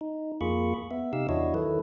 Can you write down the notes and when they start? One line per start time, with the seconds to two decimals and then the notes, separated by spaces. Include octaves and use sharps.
0.01 D#4
0.41 F2 A#3 F4 G#4 B5 C#6
0.91 B3 E5
1.13 C3 D#4 G4 F5 E6
1.29 E2 D4 E4 F#4 C#5 D#5
1.54 D#3 F#3 E4 A4 B4